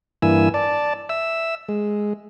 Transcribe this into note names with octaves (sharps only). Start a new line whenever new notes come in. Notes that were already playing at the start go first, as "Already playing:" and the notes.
G2 E3 A#3 E4 G#5 E6
D5 A5
E5 E6
G#3